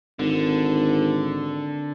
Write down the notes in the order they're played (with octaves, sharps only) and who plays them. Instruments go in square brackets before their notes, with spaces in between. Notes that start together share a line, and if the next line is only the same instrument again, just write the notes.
[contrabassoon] G#1 [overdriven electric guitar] D3